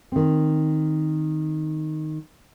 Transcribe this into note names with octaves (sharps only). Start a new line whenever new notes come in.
D#3 C4